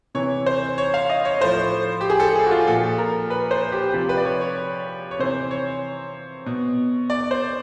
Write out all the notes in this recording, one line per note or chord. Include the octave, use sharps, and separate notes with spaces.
C3 E3 C#5
C5
C#5
F5
D#5
C#5
A2 F3 C5
G4
G#4
A4
G#4
F#4
F4
A#2 F3 A4
A#4
B4
C5
G4
C3 F3 G4
B4
D5
C#5
C#5
C#5
C3 E3 C5
C#5
B2
D5
C5